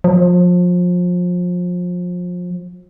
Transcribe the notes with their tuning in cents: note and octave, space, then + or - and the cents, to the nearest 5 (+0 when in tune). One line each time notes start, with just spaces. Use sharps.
F3 +30